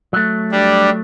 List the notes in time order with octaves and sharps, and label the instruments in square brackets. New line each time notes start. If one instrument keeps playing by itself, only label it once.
[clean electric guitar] F#3 A3
[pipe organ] G3 D4